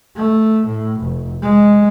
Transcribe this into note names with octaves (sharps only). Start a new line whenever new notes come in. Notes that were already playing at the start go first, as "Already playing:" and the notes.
A3
A2
F1
G#3